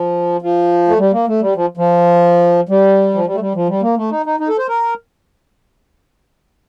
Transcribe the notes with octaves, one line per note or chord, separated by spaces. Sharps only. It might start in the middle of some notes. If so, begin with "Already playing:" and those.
Already playing: F3
F3
A3
G3
A#3
A3
G3
F3
F3
G3
F3
G3
A3
G3
F3
G3
A#3
A3
D#4
D#4
D#4
A4
C5
A#4